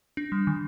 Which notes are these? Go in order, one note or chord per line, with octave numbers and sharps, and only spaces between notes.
D4
G3
D#3